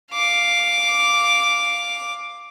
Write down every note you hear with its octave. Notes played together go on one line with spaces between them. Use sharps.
F5 D6